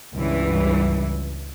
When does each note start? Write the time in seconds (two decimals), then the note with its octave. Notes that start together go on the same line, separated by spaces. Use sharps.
0.14 C#2 G2 E3